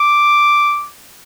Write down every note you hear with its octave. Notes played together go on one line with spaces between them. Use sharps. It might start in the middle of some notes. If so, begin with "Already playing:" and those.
Already playing: D6